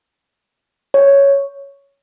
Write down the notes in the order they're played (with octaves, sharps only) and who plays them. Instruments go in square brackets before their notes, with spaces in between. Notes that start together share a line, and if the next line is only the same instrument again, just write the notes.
[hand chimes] C#5